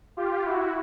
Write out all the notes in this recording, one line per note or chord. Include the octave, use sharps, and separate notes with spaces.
F4 G4
E4 F#4